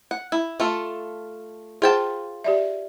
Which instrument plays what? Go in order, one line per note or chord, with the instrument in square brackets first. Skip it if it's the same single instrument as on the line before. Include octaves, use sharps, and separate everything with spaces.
[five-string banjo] F#5
E4
A3 F4 A4
[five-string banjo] F4 G5 A5 [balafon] G#4 C5 F#5
[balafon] G4 D5 E5